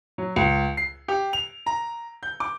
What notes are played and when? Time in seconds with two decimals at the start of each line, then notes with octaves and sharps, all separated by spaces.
0.18 F#3
0.36 C#2
0.77 C7
1.08 G4
1.33 F7
1.66 A#5
2.23 G6
2.40 D6